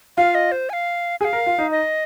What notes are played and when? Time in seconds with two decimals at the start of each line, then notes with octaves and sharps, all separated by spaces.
0.17 F4 F5
0.35 D#5
0.52 C5
0.70 G#5
0.73 F5
1.21 G#4 G#5
1.25 F5
1.33 A#4
1.46 F4
1.58 D#4
1.71 D#5